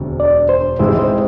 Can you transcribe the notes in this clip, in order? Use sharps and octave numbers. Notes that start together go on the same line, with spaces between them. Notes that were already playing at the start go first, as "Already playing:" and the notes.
Already playing: E1 D2 C3
D5
C5
A1 G#2 G#3 C4 E4 C5
C5